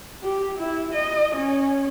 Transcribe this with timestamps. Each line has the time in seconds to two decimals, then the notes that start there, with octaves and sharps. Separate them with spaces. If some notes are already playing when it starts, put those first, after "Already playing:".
0.24 G4
0.58 E4
0.93 D#5
1.35 C#4